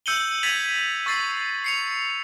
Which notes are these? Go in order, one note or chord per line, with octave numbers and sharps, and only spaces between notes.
E6 G6 C#7 D#7 F#7 G7
G#6 A6 B6 D#7 F7 F#7
C#6 E6 A6 C7
C7 C#7 F7